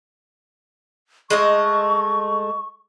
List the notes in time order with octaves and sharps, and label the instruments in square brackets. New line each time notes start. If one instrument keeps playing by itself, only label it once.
[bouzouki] G#3 A3 D#5 [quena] C#6